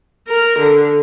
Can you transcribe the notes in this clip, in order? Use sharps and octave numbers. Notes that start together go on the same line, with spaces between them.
A#4
D3